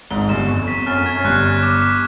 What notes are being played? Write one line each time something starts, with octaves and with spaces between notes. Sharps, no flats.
G#1 G#2 G7
G1 G2 E7
F2 C#6
B6
F#2 F6
F2
G#6
F#2
G1 G2 F#6
F#6
D6
B6